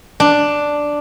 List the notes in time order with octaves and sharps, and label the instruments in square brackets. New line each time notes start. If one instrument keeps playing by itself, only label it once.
[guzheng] D4